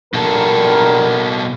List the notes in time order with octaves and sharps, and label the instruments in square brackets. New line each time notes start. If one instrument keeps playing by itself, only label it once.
[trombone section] A#1 G2 A#4 [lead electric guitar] B2 A4